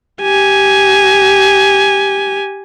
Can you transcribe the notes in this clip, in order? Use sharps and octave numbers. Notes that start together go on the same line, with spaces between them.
G4 G#5